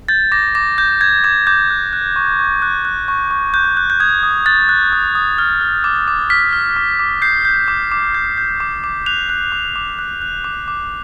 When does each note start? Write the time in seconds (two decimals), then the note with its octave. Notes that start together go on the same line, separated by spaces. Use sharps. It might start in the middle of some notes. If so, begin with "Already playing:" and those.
0.08 G6 A6
0.32 D6 A#6
0.55 D6 A#6
0.78 G6
1.01 G6 G#6
1.24 D6 G#6
1.47 D6 G6
1.70 F#6
1.93 F#6
2.16 C#6
2.39 C#6
2.62 F#6
2.85 F#6
3.08 C#6
3.31 C#6
3.54 F#6 G6
3.77 F#6
3.90 G6
4.00 D#6 G#6
4.23 D#6
4.46 F#6 A6
4.69 F#6
4.93 D#6
5.15 D#6
5.38 F6
5.61 F6
5.84 D6
6.08 D6
6.30 F6 B6
6.53 F6
6.76 D6
6.99 D6
7.22 G6 C7
7.45 G6
7.68 D6
7.92 D6
8.15 G6
8.38 G6
8.60 D6
8.84 D6
9.06 F#6 F7
9.29 F#6
9.52 D6
9.76 D6
9.99 F#6
10.22 F#6
10.44 D6
10.68 D6